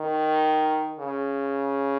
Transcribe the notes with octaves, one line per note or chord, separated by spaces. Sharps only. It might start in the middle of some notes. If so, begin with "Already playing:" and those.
Already playing: D#3
C#3